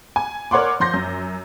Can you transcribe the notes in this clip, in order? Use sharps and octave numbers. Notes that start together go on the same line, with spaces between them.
G#5
A#4 C#5 D5 F#5 C6 D6
F3 C6 G6 A#6
F#2